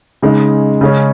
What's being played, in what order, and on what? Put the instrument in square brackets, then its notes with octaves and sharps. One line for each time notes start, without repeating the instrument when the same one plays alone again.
[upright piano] C#3 G#3 D#4
C#3 G#3 C#4